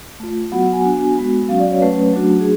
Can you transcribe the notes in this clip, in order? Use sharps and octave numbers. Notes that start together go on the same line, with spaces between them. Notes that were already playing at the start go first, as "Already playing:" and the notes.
A3 F4
F#3 B3 F#4 F#5
G#5
B3 D4 F#4
G#3 B3 F#4
F#3 C#4 F#4 F5
D5
C#5
F#3 A3 C#4 B4
F#3 A3 D4 F#4
G#4